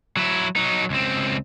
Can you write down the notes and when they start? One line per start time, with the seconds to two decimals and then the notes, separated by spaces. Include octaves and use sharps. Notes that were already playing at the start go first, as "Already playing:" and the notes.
0.17 F#3 E4
0.56 F#3 D#4
0.90 C#2 C4